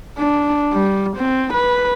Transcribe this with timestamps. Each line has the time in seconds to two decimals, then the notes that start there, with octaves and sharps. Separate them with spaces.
0.19 D4
0.73 G3
1.18 C4
1.54 B4